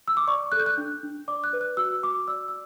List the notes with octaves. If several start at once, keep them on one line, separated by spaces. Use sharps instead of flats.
E6
D6
D5 C#6
A4 F#6
G6
F#6
D4
D4
D5 D6
F#6
B4
F#6
F#4 E6
F#4 D6
D5 E6
E6